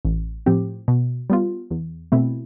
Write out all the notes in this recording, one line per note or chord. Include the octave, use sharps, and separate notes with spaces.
A1
A2 F3 C4 G4
B2
G3 B3 F4
E2
B2 A3 C4 E4